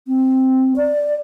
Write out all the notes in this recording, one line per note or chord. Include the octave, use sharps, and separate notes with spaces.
C4
D5